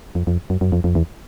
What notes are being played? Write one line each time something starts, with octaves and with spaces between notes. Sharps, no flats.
F2
F2
F#2
F#2
F2
F2
E2